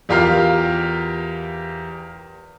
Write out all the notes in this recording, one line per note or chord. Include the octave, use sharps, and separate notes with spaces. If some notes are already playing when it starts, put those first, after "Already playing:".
E2 F4 G4 A#4 F5